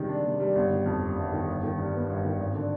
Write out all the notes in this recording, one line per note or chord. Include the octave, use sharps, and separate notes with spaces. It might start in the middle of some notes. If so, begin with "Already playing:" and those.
Already playing: C3 D#3 G3 G#3
D4
C3
G3
G1
D#3
F2
G3
G1
D#3
G1
D#3
G2
B3
G1
D#3
G#1
D3